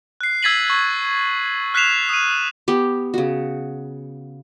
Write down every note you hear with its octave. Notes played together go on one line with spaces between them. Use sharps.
F#6 C7
E6 G#6 A6 B6 D#7 F#7
C#6 E6
F6 F#6 B6 C7 E7 F7
D#6 D#7
B3 G4
C#3 F#4